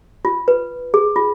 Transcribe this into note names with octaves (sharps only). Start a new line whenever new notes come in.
F4
B4
G#4
F4